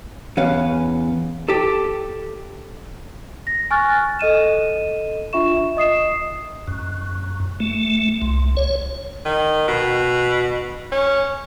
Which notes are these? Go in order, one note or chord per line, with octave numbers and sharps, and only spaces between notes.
E2 C#4 B4 F5
G4 A4
A#6
G#5 C#6 F6 F#6 A6
A4 D#5 D#7 E7
D4 F4 E5 C#6 E7
D#5 D#6 C7 E7
F#2
A3
C2
C#5
D#3
B2
C#4